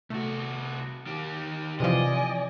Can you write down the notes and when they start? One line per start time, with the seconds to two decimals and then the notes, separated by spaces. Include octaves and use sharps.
0.10 C2 A3 F#4
1.07 D#3 G4
1.80 C3 E3 F3 D5 D#5 G#5